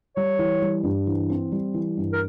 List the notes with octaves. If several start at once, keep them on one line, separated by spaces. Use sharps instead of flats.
G3 C#5
E3
G3
G2
E3
C4
G3
E3
G2
A#4